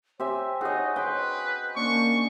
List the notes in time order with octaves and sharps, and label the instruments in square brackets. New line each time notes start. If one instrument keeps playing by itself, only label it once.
[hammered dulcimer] C4 [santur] G4 E5 G#5 [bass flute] C#5
[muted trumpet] D#4 [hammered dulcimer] F#4 [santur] G#4 D#5
[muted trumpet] B4 [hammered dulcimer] G5 C6
[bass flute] A#3 [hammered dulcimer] C#4 D4 [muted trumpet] C#6